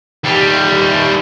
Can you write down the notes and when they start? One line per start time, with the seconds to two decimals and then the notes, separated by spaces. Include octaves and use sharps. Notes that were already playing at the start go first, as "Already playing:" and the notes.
0.24 D#2 G3